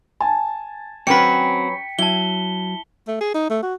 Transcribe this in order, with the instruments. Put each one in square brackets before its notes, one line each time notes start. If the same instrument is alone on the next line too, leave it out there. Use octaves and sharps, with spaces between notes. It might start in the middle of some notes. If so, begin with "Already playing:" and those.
[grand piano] G#5 A5
[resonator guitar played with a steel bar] F#3 C#4 B4 [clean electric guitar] C4 F#4 [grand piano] G5 [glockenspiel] B6 C#7
[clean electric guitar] F#3 [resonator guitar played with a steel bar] E4 [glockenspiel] A5 G7
[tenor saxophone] A3
G#4
D#4
A3
F#4